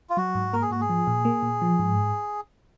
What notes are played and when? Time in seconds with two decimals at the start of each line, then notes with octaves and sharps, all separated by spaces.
0.10 F4
0.17 F#3 F#4
0.35 G#2
0.53 A#3 A#4
0.62 G#4
0.71 G#2 F#4
0.81 G#4
0.89 F3
1.07 A#2
1.25 A#3
1.42 A#2
1.62 F3
1.79 G#2